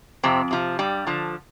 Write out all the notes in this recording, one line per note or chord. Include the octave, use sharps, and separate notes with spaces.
F2 C3 C4
C3 F3
G2 G3
D3 F3